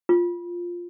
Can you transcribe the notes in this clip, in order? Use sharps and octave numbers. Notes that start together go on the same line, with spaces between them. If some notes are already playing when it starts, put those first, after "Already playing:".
F4